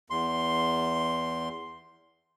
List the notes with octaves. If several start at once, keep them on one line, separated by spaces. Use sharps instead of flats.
E2 C6